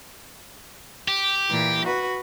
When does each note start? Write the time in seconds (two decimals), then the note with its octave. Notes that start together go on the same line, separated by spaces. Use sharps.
1.08 G4
1.50 A#2 E3
1.85 F#4 B4